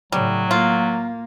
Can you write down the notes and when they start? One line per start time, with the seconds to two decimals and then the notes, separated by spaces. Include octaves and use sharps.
0.12 A2 C#3 F#3 G3
0.51 A#3 F4